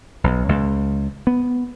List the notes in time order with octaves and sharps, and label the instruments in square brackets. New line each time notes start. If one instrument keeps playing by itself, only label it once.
[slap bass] B1
C#2
B3